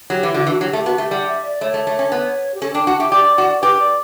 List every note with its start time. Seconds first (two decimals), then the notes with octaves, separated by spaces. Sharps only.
0.10 F#3 G4
0.23 E3
0.34 D3 F#4
0.46 E3
0.50 F#4
0.61 F#3 G4
0.73 A3 G4
0.86 B3 F#4
0.98 A3 G4
1.11 G3 F#5
1.28 E5
1.45 D5
1.61 A3 C#5
1.74 A3
1.87 A3
1.99 C#4
2.12 B3
2.54 G4
2.62 C#4 A4
2.74 D4 G5
2.87 F#4 F#5
2.99 G4 E5
3.12 G4 D5
3.38 F#4
3.62 G4 B4
3.79 D5